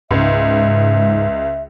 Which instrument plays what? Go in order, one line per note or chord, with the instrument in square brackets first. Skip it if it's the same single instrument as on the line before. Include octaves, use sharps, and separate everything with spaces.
[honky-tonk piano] C#2 [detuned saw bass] G#2 [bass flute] E5